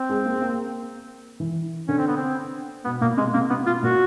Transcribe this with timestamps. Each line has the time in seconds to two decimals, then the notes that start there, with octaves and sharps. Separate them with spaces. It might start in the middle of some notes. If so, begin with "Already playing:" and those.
Already playing: C4
0.10 G#3
0.26 A#3
0.42 A#3
1.40 E3
1.88 D3 C#4
1.98 C4
2.07 B3
2.17 C4
2.85 B2 B3
3.01 A#2 A#3
3.17 C3 G#3
3.34 C3 A#3
3.50 C3 B3
3.66 B2 F4
3.83 A#2 F#4